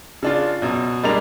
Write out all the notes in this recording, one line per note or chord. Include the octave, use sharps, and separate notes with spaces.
C#3 D4 F4
F#2 B2
G3 G#3 A#3 D4 A#5 F7